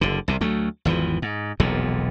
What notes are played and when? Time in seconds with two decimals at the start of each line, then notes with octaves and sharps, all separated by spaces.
0.01 F#1 D3
0.28 C2 C3
0.41 D2 F#3 A3
0.85 G#1 E2 E3 F3
1.22 G#2
1.60 E1 B1 F2 A#2